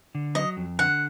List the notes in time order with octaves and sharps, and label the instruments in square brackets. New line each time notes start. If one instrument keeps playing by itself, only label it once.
[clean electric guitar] D3
[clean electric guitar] F#3 [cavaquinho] D#5
[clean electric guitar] F2
[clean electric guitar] D3 [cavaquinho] F#5